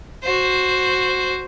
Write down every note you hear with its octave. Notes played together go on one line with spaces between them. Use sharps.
F#4 C5